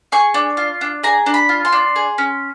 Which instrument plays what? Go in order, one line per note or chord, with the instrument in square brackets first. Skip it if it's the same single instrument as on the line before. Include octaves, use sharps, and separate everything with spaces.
[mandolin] G#4 C#6
D4
F4
D4
G#4 A#5
D4
B5
F4
C6
D4
G#4
C#4